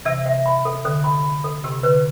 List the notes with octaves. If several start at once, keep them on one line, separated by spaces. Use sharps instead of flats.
C3 E3 E5
E5
B5
A4
D3 A4
B5
B5
A4
C3 G4
D3 B4